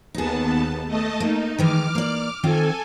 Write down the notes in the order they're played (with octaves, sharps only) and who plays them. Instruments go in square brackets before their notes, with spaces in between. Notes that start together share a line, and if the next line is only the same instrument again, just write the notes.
[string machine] D#2 B3 A5 [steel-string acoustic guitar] D#4 G#4
[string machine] A3 D#5 A5
[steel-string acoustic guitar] A#3 [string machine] D#4
[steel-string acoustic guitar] D#3 E3 G#3 [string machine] D6 F6
[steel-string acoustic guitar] A#3 D5
[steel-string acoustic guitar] D#3 C4 F4 [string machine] A4 G#5